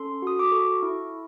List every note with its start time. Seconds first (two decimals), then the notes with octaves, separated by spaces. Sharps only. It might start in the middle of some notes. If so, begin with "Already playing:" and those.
Already playing: C#4 A4 C6
0.22 F#4 D#6
0.39 D6
0.52 A4 C#6
0.82 E4